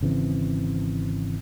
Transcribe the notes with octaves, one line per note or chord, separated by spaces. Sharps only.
G#1 C#3 E3 C4